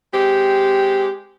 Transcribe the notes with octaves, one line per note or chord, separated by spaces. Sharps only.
G#3 C4 G4